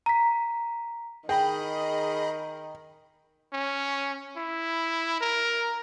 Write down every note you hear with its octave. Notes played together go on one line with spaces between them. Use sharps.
A#5 B6
D#3 G#4 D#5 G5 B5
C#4
E4
A#4